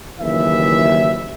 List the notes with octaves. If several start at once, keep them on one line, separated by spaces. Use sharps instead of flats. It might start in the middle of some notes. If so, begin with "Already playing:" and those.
F#1 D#2 E3 E5